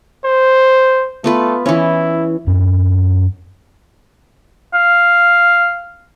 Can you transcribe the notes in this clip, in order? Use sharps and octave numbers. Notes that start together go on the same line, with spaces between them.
C5
A3 B3 F4 B4
E3 C#4 E4
F#2 C4
F5